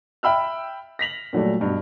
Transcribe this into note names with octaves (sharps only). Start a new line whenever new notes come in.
E5 G5 B5 E6 F6
A#6 B6 F7 F#7
A#2 F#3 G3 A3
G2 B2